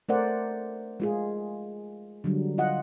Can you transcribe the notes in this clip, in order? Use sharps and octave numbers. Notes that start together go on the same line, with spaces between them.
A3 A#4 C5 D5 F#5
G#3 F4 G#4
D3 F#3 G3
F4 D#5 F#5